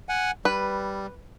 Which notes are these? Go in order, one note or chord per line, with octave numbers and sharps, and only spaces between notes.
F#5 G#5
G3 B4